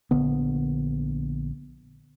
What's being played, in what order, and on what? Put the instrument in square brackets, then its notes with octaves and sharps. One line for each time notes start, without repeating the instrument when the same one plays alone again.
[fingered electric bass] A#1 D3 B3